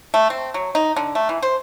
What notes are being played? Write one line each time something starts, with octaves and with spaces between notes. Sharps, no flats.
A3
C4
F#3
D#4
D3
A3
E3
C5